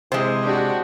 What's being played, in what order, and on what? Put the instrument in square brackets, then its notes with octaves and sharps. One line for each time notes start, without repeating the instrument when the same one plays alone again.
[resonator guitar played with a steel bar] C3 G#3 [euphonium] E3 [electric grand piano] C5
[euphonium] D4 [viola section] F#4 G4